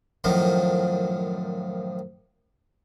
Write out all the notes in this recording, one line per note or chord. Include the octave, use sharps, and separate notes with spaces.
F#2 A2 D#3 F3